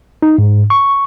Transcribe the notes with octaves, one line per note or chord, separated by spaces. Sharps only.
D#4
G#2
C#6